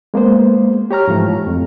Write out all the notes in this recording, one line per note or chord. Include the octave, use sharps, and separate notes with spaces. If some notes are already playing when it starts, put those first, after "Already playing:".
G#3 A#3 B3 C5
G4 C#5 A#5 F6
G#2 E3 F3 A3
F2